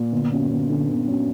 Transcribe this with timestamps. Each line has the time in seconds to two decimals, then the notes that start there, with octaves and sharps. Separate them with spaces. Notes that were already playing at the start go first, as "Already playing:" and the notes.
Already playing: A#2
0.12 G1
0.31 F#2
0.51 G1
0.69 D3
0.89 G1
1.07 F#2